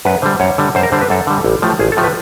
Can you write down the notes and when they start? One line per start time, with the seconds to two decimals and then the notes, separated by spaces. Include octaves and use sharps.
0.05 F#2 B4
0.22 D3 G3 C5
0.40 F#2 C#5
0.58 D3 G3
0.75 F#2 C5
0.83 A#4
0.92 D3 G3 C5
1.01 B4
1.10 F#2 A4
1.27 D3 G3
1.44 A1
1.62 A2 F3 A3
1.79 A1 G#4
1.92 A4
1.97 A2 F3 A3
2.04 B4